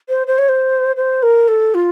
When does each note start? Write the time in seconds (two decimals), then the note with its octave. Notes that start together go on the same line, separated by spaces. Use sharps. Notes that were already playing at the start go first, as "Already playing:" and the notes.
0.09 C5
0.27 C5
0.38 C#5
0.49 C5
0.96 C5
1.23 A#4
1.48 A4
1.74 F4